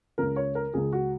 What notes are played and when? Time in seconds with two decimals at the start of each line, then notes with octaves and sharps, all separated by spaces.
0.18 C#2 C#3 A#4
0.36 C#5
0.55 A#4
0.74 C#2 C#3 G#4
0.92 F#4